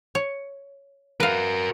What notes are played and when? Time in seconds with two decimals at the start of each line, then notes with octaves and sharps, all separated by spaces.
0.15 C#5
1.20 F#4 A#4 B4 F5